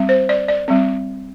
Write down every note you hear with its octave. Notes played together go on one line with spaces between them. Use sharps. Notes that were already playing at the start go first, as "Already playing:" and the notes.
Already playing: G3 C4
C5
D5
D5
G3 C4